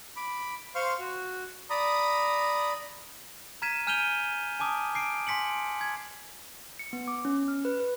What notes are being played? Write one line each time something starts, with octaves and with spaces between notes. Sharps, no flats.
B5 D6
C5 F5 C6 C#6 F6
F#4
D5 A#5 B5 D#6
A#5 F6 G#6 B6 D#7 E7
G#5 F6 G6 D#7 F7 G7
G#5 A5 D6 D#6
D6 C7 D7
G#5 C6 B6 C#7 F#7
G#6
C#7
B3
D6
C#4
F6
B4
B4